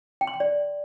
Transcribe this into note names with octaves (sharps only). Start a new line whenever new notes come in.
G5
C6
G5
D5